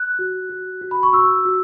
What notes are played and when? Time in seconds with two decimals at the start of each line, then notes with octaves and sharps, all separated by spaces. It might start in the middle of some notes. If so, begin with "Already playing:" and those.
Already playing: F#6
0.19 F#4
0.49 F#4
0.81 F#4
0.91 B5
1.03 C#6
1.13 F#4 E6
1.46 F#4